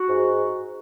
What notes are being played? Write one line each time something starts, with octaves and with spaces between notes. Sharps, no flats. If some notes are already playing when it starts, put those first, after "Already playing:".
Already playing: F#4
G#2